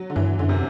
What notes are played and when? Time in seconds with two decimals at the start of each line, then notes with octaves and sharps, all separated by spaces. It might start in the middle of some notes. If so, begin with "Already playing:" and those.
Already playing: F#3
0.10 D3
0.16 G2 E3
0.39 F#2 D3
0.49 C3